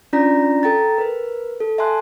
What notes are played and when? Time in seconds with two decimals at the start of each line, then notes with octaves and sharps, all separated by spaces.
0.13 C#4 D4 F4 D5 A#5 A#6
0.63 A4 G5 A#5 A6
0.98 A#4 B4
1.60 A4
1.78 E5 G#5 A5 C6 F#6